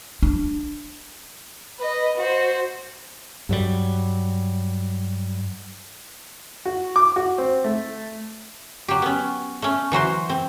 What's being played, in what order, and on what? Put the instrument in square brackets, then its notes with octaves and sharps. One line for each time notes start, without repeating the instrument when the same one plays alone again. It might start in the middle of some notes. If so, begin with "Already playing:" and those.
[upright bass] D4
[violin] B4 D#5
F#4 C5
[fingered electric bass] G2 F#3 G3
[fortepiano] F#4
D6
F#4
C4
A3
[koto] F#3 G4
B3 C#4
A3 C#4
E3 F#3 F#4 C5
C4